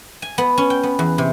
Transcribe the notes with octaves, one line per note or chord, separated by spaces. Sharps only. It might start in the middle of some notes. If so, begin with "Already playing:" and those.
G#5
B3
C#4
G5
B3
E2
C3